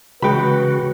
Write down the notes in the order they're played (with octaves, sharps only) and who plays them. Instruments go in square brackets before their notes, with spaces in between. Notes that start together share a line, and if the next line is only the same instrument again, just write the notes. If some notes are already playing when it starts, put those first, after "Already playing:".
[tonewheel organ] C#3 F#4 [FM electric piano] E3 G#3 [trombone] B4 [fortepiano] G5 B5